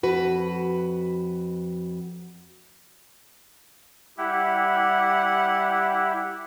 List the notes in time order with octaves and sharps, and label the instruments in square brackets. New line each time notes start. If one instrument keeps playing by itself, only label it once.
[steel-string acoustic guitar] F2 F#4 B4
[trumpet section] G3 F#5 [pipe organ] E4 G4